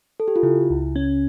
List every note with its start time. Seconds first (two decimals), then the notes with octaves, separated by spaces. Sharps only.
0.20 A4
0.28 G4
0.36 F4
0.43 C#3 E4
0.70 C#2
0.96 C#4